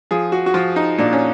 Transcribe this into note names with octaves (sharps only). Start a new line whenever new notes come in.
F3 G#4
F#4
F#4
F3 F4
D#4
A#2 D4
C#4